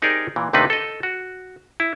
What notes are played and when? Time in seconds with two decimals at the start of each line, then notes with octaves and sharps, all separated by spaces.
0.02 C4 D#4 G4 G#4 A#4 D5
0.36 A#2 E3
0.53 D#2 C3 A3 D4 D#4 B4
0.70 A4 D#5
1.03 F#4
1.80 E4